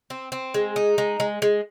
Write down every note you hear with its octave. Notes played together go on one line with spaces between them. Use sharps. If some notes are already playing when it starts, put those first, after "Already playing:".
C4
C4
G#3
D#4
G#3
G#3
G#3